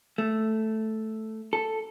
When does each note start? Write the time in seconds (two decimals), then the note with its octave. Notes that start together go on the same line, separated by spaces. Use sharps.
0.18 A3
1.53 A4